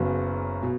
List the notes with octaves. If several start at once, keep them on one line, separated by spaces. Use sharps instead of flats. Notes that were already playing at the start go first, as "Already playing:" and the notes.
Already playing: F#1 F#2 C#3 F#3 B3
B2